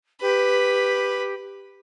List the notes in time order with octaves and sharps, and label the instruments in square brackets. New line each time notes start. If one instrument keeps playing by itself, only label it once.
[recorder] G4 [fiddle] B4